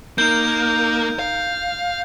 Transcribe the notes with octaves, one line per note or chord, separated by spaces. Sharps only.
A#3 D#4 A#4 G6
F5